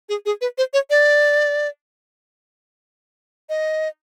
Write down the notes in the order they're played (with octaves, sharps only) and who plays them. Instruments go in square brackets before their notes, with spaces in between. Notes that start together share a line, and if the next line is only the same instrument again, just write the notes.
[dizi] G#4
G#4
B4
C5
C#5
D5
D#5